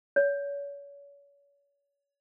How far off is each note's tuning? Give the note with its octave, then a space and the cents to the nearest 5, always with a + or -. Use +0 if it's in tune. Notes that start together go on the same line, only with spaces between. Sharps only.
C#5 +35